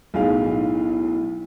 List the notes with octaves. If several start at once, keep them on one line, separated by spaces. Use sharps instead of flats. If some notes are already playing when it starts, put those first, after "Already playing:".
B1 A2 G#4 F5